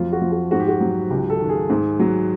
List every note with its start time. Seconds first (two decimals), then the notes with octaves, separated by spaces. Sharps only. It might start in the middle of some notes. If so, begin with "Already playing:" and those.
Already playing: F2 F#3 F4
0.12 F#4
0.21 F3
0.32 F#4
0.51 G#2 F#4
0.60 G4
0.68 F#4
0.81 F#3
1.10 C#2 G4
1.30 A4
1.39 D#3
1.49 G#4
1.70 G#2
1.99 F#3